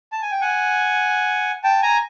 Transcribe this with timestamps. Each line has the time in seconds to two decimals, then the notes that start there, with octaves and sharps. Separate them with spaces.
0.12 A5
0.22 G#5
0.31 G5
0.41 F#5 G#5
1.64 G5 A5
1.82 G#5 A#5